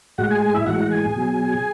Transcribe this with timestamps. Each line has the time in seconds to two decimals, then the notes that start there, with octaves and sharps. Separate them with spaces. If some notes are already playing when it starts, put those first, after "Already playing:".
0.18 A2 G#3 F#4 F#5
0.30 G#4 G#5
0.42 G#4 G#5
0.54 E4 E5
0.66 A2 E3 G#3 F#4 F#5
0.91 G#4 G#5
1.16 B2 F#3